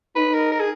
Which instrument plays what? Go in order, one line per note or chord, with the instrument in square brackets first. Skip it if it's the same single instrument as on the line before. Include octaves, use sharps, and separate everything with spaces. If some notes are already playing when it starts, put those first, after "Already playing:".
[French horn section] D#4 [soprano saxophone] B4
[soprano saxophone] A#4
A#4
G#4